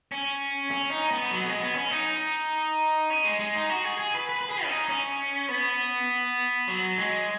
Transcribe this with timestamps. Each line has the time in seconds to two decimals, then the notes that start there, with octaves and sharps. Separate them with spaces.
0.12 C#4
0.71 C#4
0.91 D#4
1.11 B3
1.31 F#3
1.41 B3
1.46 G#3
1.61 B3
1.76 C#4
1.91 D#4
3.10 C#4
3.25 G#3
3.40 G#3
3.55 D#4
3.70 F#4
3.84 G#4
4.00 G#4
4.14 B4
4.29 B4
4.41 B4
4.49 G#4
4.64 C#4
4.69 D#4
4.89 C#4
5.49 B3
6.68 F#3
6.98 G#3